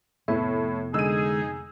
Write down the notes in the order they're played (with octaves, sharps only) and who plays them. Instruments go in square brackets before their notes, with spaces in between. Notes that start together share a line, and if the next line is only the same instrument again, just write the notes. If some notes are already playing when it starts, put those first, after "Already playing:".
[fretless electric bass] F1 B3 [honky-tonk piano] A2 [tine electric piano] E5
[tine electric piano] D3 G#3 [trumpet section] D#4 G#4 [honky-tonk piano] E6 D#7